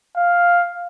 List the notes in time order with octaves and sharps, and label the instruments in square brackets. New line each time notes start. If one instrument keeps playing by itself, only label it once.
[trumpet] F5